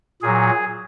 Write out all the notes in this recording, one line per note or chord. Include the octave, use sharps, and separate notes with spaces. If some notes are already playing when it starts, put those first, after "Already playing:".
A#2 F#3 G#4